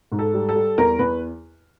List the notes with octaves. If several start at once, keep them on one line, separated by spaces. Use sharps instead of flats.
G#2
A4
G3
A4
G3
E2 A#4
E2 B4